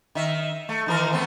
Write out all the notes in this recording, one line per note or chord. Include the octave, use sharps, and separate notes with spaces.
D#3 E5
A3
D#3 E3 A#4
A3 B3 C4